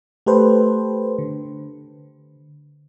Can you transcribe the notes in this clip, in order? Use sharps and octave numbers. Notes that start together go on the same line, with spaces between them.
A3 G4 A4 B4 C5
D3